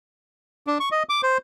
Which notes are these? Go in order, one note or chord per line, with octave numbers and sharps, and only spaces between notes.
D4
C#6
D#5
D6
C5